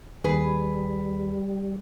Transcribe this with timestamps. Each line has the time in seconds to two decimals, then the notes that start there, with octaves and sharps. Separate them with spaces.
0.24 D#2 G3 G#4 B4